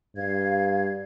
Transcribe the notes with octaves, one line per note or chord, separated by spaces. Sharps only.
G2 F5 G#6